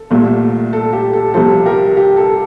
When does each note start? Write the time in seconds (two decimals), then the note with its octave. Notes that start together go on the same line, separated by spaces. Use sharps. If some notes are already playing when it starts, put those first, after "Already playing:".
Already playing: A4
0.10 C2 A#2 A3
0.73 A4
0.93 G4
1.13 A4
1.34 C2 C3 F3 A4 C5
1.65 G4 A#4
1.97 G4
2.17 A4